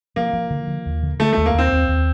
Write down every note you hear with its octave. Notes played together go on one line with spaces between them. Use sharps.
F3 A#3
F3
D3
F3
D#2
D3
D3 A3
D#2 A3
A#3
D#2 C4
D#2
D#2